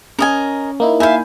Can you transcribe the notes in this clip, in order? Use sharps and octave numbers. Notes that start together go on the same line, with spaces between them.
C#4 A#4 D#5 G#5
A#3 D#4 E4
E5 F5 G#5 B5 G6